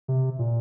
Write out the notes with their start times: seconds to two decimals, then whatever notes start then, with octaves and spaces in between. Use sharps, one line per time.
0.08 C3
0.39 A#2